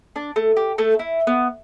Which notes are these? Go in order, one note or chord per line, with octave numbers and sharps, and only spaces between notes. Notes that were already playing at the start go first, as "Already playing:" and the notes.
D4
A3
G4
A3 A4
E4
B3